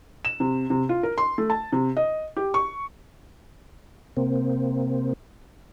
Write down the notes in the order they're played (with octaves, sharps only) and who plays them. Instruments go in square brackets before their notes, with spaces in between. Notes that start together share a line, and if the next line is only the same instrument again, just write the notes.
[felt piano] E7
C3
C3
F4
A#4
C6
A3
A5
C3
D#5
G4
C#6
[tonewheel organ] C3 A#3 C4